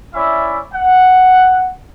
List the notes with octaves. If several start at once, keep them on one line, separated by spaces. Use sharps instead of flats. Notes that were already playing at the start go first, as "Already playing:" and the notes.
C#4 E4 D5 E5
F#5